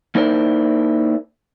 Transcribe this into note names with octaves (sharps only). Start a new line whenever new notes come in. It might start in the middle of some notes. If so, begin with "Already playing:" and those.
A#3 D#4 E4 A#4 C5 D5